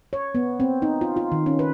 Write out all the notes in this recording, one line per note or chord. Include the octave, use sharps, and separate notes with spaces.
C#5
B3
C4
D#4
F4
F4
D#3
C#4
B4